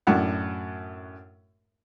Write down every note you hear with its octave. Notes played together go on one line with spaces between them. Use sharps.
F#2 A2 D4 F#4 F#5